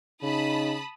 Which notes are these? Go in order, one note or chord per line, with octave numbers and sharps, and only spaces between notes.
C#3 D#4 A5 B5 D#6